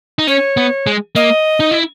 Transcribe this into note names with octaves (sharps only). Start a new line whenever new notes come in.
D#4
C#4 C#5
B3
G#3
A#3 D#5
D#4
E4